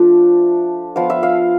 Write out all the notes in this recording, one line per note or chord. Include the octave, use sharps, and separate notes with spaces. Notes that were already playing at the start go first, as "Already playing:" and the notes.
Already playing: F3 A3 D4
F3 B3 F4 F5
E5
F5